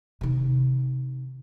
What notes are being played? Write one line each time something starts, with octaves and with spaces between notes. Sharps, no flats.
C3 D#3